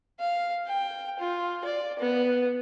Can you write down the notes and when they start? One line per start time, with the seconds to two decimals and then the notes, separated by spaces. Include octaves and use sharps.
0.20 F5
0.67 G5
1.19 F4
1.64 D5
1.99 B3